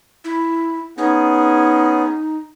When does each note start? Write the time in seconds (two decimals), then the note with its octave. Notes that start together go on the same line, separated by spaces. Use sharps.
0.24 E4
0.98 B3 C#4 D#4 G#4